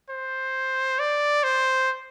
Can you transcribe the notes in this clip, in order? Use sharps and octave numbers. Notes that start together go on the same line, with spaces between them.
C5
D5
C5